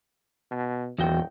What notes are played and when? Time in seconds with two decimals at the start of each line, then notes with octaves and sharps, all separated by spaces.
0.51 B2
0.98 D#1 E2 F#4 G5